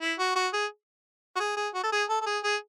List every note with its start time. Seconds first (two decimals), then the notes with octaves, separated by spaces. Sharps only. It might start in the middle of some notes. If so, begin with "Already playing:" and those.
0.02 E4
0.19 F#4
0.36 F#4
0.53 G#4
1.36 F#4
1.40 G#4
1.57 G#4
1.74 F#4
1.84 A4
1.92 G#4
2.10 A4
2.21 A4
2.26 G#4
2.44 G#4